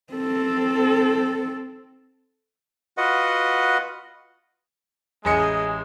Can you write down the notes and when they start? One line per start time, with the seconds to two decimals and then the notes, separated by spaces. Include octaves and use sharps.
0.13 C4 A4
2.97 F4 F#4 B4 D#5 F#5
5.25 A1 G#3 G#4 D#5 G#5 C#7